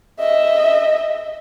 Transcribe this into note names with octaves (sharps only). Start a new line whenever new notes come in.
D#5 E5